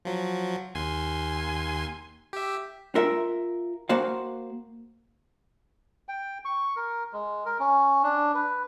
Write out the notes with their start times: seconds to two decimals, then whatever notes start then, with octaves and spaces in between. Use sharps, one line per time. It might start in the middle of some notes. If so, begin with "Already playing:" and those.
0.05 F3 F#3
0.75 D#2 G#5 C6
2.33 G4 E5
2.95 F4 A#4 E5
3.89 A#3 F#4 C5 F5
6.08 G5
6.45 C#6
6.76 A#4
7.13 G#3
7.46 A#4
7.60 C#4
8.04 D4
8.35 B4